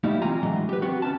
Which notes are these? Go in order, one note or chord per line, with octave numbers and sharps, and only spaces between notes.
G3 A3 A#3 D#4 E4
E3 C4 F4 G#5 A#5
A2 D3 E3 F#3 G#3
G4 B4
B3 C4 F#4
D#2 C#4 A5